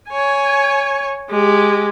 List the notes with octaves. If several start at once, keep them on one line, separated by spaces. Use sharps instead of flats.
C#5 G#5
G#3 G4